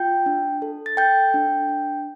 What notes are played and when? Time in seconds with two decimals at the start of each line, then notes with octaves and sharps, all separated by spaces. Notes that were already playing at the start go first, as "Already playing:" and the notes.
Already playing: F4 G5 G6
0.26 D4
0.62 A4
0.86 A6
0.97 A4 G5 G6
1.34 D4
1.69 D4